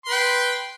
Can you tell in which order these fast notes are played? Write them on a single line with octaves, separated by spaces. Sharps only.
C6 B4 G5